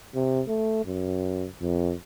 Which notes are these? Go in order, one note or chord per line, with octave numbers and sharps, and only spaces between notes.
C3
A3
F#2
F2